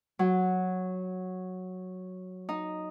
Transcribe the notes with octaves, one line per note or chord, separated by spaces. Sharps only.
F#3
D#4